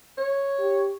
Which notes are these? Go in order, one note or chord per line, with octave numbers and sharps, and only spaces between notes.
C#5
G4